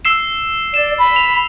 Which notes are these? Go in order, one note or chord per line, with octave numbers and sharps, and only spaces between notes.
E6 C7 E7
D5 E7
B5
F7